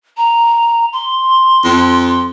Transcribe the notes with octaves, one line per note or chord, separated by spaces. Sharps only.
A#5
C6
F2